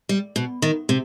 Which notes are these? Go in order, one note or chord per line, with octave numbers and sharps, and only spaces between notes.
G3
B2
D#3
C3